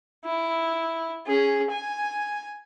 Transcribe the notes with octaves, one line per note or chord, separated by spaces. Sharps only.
E4
C#4 G#4
G#5